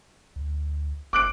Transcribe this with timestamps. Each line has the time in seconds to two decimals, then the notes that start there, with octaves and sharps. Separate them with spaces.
0.36 D2
1.13 G1 D6 F#6 D7